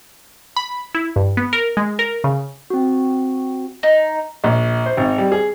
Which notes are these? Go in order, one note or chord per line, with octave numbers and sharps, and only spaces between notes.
B5
E4
G2
B3
A#4
G#3
A#4
C#3
C4 F#4
D#4
A#1
C5
G#1
G3
G#4